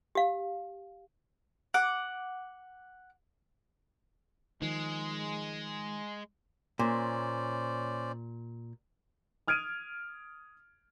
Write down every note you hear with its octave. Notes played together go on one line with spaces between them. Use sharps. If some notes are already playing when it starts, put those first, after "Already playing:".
G4 F5
F#5 D6
D#3 F3 G#3
A#2 C#4 C5 D5
D#6 F6 G#6 D7 D#7